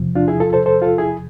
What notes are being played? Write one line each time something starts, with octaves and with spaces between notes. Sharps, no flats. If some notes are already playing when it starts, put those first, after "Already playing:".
Already playing: E2 C3 F3
D4 F4
E4 G#4
F4 A4
A4 C5
A4 C5
F4 A4
E4 G#4